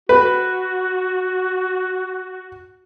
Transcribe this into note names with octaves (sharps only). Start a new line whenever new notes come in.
F#4 B4